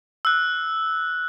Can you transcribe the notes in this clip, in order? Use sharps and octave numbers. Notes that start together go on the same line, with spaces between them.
E6 F#6